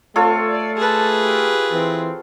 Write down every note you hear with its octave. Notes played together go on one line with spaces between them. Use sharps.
A3 C4 F4 A4 C#5
D5
G#4 B4 A5
G4
E3 C4